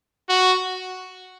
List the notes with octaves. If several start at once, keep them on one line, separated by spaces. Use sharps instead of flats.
F#4